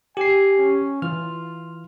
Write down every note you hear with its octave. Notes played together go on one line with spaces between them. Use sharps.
G4 G#5 C7
C#4
E3 F4 F6